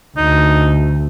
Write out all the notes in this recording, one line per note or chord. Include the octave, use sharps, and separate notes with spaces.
D2 D#4